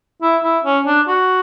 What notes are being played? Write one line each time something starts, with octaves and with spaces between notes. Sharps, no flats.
E4
E4
C#4
D4
F#4